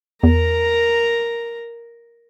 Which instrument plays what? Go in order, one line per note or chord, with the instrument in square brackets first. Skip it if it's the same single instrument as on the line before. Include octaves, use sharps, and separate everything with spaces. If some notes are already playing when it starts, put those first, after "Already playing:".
[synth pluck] E2 [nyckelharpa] A#4 A#5